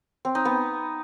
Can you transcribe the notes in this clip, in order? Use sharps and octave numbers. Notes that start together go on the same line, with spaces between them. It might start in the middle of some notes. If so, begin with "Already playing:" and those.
C4
D#4
B3